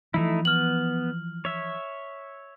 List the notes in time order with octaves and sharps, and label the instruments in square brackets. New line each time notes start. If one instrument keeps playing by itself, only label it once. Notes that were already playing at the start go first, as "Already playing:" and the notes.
[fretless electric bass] E3 F3 [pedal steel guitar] A3 D#4 E4
[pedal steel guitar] B3 [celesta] F6 F#7
[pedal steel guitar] C#5 E5